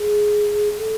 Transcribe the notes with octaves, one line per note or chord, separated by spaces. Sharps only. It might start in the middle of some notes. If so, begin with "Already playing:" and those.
Already playing: G#4
A4